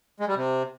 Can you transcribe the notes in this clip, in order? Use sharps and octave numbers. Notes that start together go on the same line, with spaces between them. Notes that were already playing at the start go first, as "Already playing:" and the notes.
G#3
G3
C3